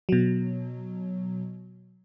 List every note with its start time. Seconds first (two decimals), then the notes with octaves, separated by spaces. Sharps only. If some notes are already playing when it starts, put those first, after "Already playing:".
0.09 B2 F#3